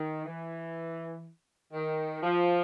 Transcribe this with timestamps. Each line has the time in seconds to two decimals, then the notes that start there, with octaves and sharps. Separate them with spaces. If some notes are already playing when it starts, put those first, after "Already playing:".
Already playing: D#3
0.25 E3
1.73 D#3
2.23 F3